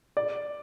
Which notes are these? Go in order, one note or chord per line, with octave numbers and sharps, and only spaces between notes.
D5